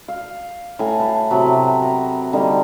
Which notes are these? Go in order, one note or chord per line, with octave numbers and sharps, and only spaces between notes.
F5
A2 G#5 A#5
B4 A5
C3 F#3 B3 B5
A#4
D3 G3 A#3 D#4